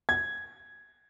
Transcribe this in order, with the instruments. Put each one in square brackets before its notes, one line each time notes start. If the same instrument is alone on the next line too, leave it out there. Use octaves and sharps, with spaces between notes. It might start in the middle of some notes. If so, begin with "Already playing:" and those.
[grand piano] G#6